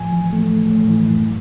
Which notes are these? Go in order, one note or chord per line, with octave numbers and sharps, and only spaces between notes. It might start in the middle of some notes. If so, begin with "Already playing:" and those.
Already playing: A2 F3 G#5
E3
A3
A2
A2
E3
F#2